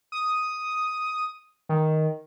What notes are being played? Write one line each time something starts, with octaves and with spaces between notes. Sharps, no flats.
D#6
D#3